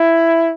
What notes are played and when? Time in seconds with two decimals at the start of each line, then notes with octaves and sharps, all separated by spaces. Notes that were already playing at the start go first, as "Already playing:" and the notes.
Already playing: E4